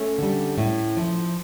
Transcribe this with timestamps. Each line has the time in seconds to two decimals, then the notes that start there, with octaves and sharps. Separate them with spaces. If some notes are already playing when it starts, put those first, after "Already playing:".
Already playing: A3 C#4
0.18 D3 G3
0.58 A2
0.97 F3